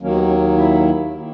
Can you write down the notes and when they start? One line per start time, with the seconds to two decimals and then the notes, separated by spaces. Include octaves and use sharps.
0.01 D#2 D#3 F#3 A#3 C#4
0.15 B3
0.29 C#4
0.57 E4
1.14 D#3 A#3